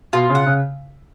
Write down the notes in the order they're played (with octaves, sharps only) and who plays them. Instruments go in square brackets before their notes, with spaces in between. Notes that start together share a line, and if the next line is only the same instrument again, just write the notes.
[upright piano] B2 [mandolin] F4
[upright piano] C#3
[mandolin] F#5
[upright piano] C#3